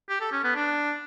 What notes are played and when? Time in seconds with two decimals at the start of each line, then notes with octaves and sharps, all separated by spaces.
0.09 G4
0.21 A4
0.32 C#4
0.44 B3
0.55 D4